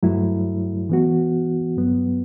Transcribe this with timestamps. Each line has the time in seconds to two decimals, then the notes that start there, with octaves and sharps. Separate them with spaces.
0.03 G2 F#3 A3 E4
0.89 E3 B3 F#4
1.77 G2 F#3 B3